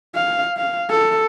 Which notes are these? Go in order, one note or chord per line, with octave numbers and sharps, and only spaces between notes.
F5
F5
A4